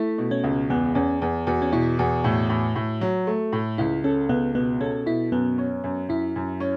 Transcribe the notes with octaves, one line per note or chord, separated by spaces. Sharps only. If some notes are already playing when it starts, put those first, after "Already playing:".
Already playing: A3 E4
B2
C#4
C#2
E2 B3
E2 C#4
E2
E2 F#4
C#4
B2 E4
E2 F#4
A2
A2
A2
F#3
A3
A2
C#2 E4
C#4 A4
C#2 B3
B2 B3
C#4 A4
B2 E4
F#2 B3
C#4
F#2
F#2 E4
F#2
C#4